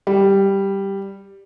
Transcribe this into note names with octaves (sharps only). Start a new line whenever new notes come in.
G3